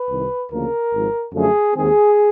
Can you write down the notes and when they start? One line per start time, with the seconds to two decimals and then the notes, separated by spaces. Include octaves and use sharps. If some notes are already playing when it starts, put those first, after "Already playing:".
Already playing: B4
0.10 C2 C3 D#3
0.51 D2 C#3 F3 A#3 A#4
0.92 G#1 G#2 F3
1.33 F#2 D3 F3 A3 G#4
1.74 D#2 D#3 G#3 C4 G#4